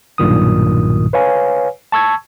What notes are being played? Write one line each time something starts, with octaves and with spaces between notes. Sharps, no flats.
B1 G2 A#2 D#3 D#6
B4 C#5 F5 G#5
A5 C#6 E6 G#6